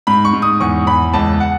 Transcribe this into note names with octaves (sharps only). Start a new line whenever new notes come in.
G#2 B5
C#6
G#2
D#6
E2 C#6
E2 B5
C#2 A5
F#5